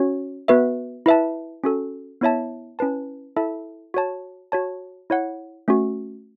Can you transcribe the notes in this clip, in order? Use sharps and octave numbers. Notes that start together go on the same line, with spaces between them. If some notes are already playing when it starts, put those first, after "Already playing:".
Already playing: C#4 F#4 C#5
B3 F#4 B4 E5
E4 B4 E5 A5
C#4 F#4 A4
B3 E4 C#5 E5 A5
C#4 E4 B4 A5
E4 A4 E5 A5
F#4 C#5 A5
F#4 C#5 A5
E4 C#5 F#5
A3 C#4 F#4